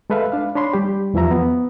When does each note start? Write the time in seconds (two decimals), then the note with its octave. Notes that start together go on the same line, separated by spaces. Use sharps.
0.10 G#3 A4 B4 E5 F5
0.32 D4 F5
0.55 D4 C#5 B5 C6
0.73 G3 G4
1.14 E2 E3 F3 E5 A#5
1.31 B3